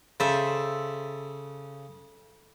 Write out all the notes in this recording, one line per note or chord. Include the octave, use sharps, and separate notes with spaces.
C#3 A4 C5 E5